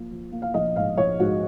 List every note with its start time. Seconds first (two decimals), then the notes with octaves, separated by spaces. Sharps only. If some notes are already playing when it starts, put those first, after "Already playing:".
Already playing: F3 A#3
0.11 F3
0.32 A#3
0.42 F5
0.54 A#1 D#5
0.76 G#2 F5
0.98 A#1 C#5
1.20 G#2 F#4